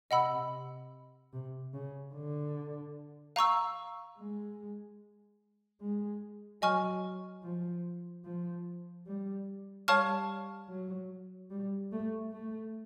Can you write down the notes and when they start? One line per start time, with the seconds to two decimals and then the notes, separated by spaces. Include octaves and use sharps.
0.11 C3 D#5 F#5 B5 E6
1.33 C3
1.74 C#3
2.14 D3
3.36 F5 A#5 C#6 E6
4.18 G#3
5.81 G#3
6.62 F#3 D#5 G#5 C#6 F6
7.44 F3
8.25 F3
9.07 G3
9.88 G3 C#5 F5 A5 C#6 F6
10.69 F#3
11.51 G3
11.92 A3
12.32 A3